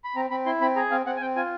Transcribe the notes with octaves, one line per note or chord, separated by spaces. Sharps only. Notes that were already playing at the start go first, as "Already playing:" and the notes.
B5
C4 A#5
C4 B5
E4 C6
C4 B5
G#4 A#5
C4 F5
C4 F#5
G#5
C4 G5
F4 G#5